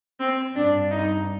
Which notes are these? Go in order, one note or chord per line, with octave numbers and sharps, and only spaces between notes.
C4
G2 D4
D#4